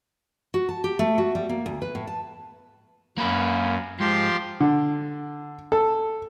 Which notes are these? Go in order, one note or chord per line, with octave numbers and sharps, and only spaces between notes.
F#4
A5
G4
A3
F#4
G3
A#3
D2
B4
A2
A5
F#2 A#3 B4
G#2 F3 G4 C6
D3
A4